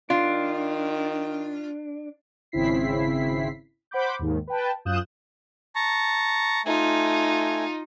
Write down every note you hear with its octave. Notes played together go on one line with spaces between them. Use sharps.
D#3 D4 F4
G#1 C#3 C4 E4 B6 C7
C5 F#5 B5 D6 G6
D#2 G#2 D#3
B4 G5 A5
F#2 F4 D#6 F#6 G6 E7
A5 A#5 C#6
A3 D#4 F4 G#5